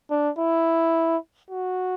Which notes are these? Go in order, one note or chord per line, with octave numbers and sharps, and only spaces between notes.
D4
E4
F#4